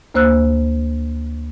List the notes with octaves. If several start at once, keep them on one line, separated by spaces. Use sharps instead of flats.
D2 A#3 C5 E6 F#6